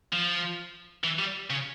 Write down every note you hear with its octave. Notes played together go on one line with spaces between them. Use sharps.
F3
E3
G3
C#3